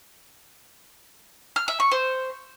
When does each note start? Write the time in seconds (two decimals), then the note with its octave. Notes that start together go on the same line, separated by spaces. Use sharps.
1.56 F6
1.68 E5
1.80 C#6
1.92 C5